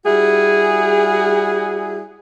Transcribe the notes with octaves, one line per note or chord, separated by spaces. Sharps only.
G3 E4 F#4 G#4